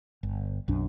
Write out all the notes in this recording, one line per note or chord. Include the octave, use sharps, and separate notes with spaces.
G1
B1 F#2 D4